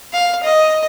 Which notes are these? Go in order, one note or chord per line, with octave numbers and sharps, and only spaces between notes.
F5
D#5